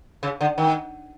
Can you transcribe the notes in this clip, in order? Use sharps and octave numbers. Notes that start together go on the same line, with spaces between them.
C#3
D3
D#3